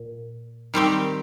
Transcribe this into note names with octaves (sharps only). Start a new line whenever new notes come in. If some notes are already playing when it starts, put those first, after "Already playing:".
Already playing: A#2
D#3 G3 C4 G4